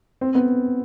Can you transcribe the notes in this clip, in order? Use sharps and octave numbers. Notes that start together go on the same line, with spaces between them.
C4
B3